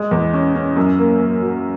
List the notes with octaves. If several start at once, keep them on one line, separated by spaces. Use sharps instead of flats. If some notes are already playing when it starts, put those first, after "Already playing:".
Already playing: G#3
E2
C#4
C#4
F#2
A#3
A#3
F#3